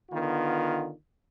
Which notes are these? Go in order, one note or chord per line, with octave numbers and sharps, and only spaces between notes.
D3 D#3 B3 F4